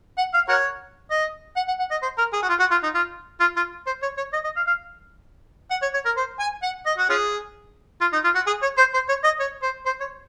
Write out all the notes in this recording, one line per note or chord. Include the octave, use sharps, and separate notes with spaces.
F#5
F5
F#4 A#4 C#5
D#5
F#5
F#5
F#5
D#5
C5
A#4
G#4
F#4
F4
F#4
F4
D#4
F4
F4
F4
C5
C#5
C#5
D#5
D#5
F5
F5
F#5
C#5
C#5
A#4
C5
G#5
F#5
D#5
F#4
C#4 F4 G#4
F4
D#4
F4
F#4
G#4
C#5
C5
C5
C#5
D#5
C#5
C5
C5
C#5